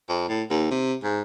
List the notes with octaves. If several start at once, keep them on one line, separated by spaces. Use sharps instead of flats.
F2
A2
D#2
C3
G#2